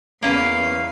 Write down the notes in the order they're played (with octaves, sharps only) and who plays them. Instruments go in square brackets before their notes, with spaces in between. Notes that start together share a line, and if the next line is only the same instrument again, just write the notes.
[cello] E2 F5 [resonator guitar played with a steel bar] A#3 C#4 B4